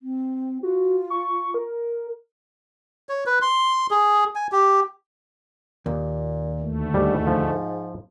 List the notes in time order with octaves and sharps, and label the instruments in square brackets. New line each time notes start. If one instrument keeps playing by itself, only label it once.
[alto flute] C4
[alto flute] F4 [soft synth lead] F#4
[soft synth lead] C#6
A#4
[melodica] C#5
B4
C6
G#4
G#5
G4
[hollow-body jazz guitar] D#2 [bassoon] A#2
[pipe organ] D2 A3
[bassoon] G#2 [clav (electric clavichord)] G3
[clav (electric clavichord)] F3